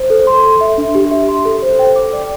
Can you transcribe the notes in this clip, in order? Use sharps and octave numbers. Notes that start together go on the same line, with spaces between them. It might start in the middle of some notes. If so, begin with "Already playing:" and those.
Already playing: C5
A4
C6
C6
E5
D4
G4
E5
C6
A4
C5
G5
D6
D5